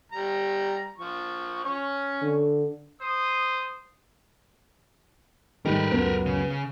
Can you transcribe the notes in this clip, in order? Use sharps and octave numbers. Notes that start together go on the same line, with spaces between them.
G3 A#5
F3 C#6
C#4 C#6
D3
C5 D#6
G#2 D#3 G3 A#4 B4
C#2 F#2 B3
C#3